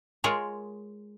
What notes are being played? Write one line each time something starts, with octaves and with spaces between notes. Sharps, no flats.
G#3 F4 G#4 A#4 C#5